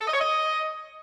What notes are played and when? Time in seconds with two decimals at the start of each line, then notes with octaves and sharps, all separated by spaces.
0.01 A4
0.07 D#5
0.14 C#5
0.21 D#5